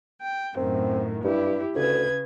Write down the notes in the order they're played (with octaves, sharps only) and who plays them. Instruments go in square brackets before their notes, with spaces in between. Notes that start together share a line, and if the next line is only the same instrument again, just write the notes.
[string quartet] G5
[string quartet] F#2 A2 D#3 [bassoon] C4
[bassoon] G2 [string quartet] E4 G4
[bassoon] D2 [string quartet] C#3 B4 G#6